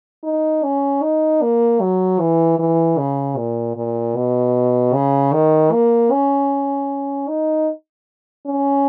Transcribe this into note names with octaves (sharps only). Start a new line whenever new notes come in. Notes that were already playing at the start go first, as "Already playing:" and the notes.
D#4
C#4
D#4
A#3
F#3
E3
E3
C#3
A#2
A#2
B2
C#3
D#3
A#3
C#4
D#4
C#4